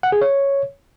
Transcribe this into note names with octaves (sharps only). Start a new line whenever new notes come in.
F#5
G#4
C#5